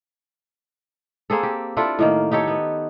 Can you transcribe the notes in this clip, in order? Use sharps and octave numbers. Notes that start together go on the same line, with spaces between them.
A#3 C4 G#4 A4
G4
D4 E4 F4 A4
A2 D#3 A#3
D#4 G4 A4 C#5
B3